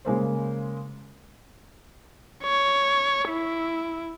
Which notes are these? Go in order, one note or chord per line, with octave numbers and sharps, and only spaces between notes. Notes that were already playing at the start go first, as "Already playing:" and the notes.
C#3 G#3 A#3 C5
C#5
E4